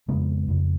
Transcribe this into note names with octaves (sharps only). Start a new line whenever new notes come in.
F2 C#3 G#3 B3
F2 C#3